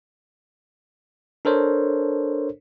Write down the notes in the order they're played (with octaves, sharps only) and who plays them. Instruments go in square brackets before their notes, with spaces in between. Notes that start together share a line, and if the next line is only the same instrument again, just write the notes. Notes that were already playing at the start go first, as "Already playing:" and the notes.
[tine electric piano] D4 A4 A#4 C5 C#5